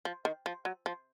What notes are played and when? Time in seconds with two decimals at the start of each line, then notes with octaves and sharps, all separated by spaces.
0.05 F3
0.25 D#3
0.46 F3
0.65 F#3
0.86 F3